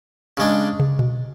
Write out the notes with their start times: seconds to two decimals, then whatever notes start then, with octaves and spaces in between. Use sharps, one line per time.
0.37 C#3 G#3 D4
0.80 C#3
0.99 B2